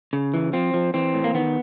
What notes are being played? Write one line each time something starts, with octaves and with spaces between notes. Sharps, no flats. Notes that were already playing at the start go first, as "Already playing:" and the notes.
C#3
E3
F3 C4
F3
E3 C4
A2
A#3
D#3 B3